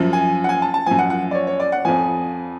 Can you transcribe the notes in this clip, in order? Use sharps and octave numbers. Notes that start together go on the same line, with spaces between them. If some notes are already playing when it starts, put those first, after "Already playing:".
Already playing: F#2 F3
G#5
F#5
G#5
A5
A5
F#2 F3 G#5
F#5
F#5
D5
C#5
C#5
D5
F#5
F2 F3 G#5